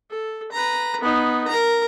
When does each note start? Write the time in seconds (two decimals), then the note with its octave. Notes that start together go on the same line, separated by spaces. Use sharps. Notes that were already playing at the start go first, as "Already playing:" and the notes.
0.10 A4
0.52 B4 A#5
1.01 B3 D#4
1.48 A#4 A#5